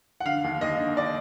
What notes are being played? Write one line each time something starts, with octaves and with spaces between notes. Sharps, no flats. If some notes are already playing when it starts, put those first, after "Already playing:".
F#5
D3 F5
D#2
D#2 D#5
D3
D5